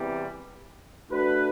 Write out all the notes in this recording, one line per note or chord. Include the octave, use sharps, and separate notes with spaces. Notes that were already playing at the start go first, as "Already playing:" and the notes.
Already playing: E2 C3 E3 G3
A3 D4 F#4 B4